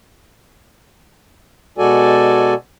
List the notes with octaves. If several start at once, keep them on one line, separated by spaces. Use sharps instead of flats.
B2 G#3 F#4 A4 D5 G#5